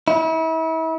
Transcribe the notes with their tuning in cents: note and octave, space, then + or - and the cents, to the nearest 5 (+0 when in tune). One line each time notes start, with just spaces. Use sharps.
E4 -35